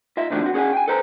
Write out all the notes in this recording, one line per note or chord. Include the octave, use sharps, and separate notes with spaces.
F4 D#5 E5
C3 D#3 F3 F#3 A3 D4
C4 F#4
C#4 G#4 C5 F#5 G#5
G5 G#5
A4 B4 C5 A#5